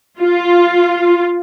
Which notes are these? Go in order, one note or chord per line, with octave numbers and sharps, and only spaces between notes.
F4